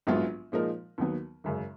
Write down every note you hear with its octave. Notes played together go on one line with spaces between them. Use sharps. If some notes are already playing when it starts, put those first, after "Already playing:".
A#1 G#2 F#3 B3 F4
A#2 F3 G#3 D#4 A#4
D#2 D#3 F#3 B3
G#1 F#2 C#3